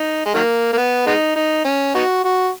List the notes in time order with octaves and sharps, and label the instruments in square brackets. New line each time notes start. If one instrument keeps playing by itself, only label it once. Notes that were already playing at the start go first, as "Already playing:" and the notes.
Already playing: [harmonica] D#4
G#3
D#3 F#3 A#3
A#3
B3
G#3 B3 D#4
D#4
C#4
B3 D#4 F#4
F#4